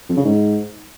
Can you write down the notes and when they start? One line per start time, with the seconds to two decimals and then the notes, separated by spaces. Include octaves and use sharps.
0.09 F2
0.17 C#3
0.25 G#2